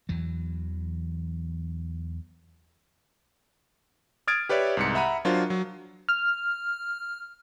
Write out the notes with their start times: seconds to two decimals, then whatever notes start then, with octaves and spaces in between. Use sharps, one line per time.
0.09 E2 E3 F#3
4.27 D#6 F6 G#6 A6 D7
4.49 G4 B4 C#5 D5 E5
4.77 C2 G#2 C#7
4.95 E5 F#5 A#5 B5 D#7
5.25 F#3 D4 F4 A#4 C5
5.50 F#3
6.09 F6